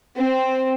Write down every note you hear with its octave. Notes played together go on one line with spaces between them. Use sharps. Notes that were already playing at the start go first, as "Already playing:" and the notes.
C4